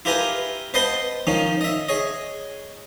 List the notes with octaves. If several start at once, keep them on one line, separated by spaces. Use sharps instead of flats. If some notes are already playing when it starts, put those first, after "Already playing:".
E4 F4 G4 A#4 B4 G#5
B4 C5 D#5 F#5 A5 C6
D#3 F3 C#4 D#4
D#5 E5
G#4 C#5 D#5